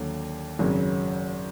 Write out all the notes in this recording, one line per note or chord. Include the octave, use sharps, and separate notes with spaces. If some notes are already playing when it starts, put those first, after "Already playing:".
Already playing: D#2 D3 F#3 A#3
G#1 F#2 C#3 F#3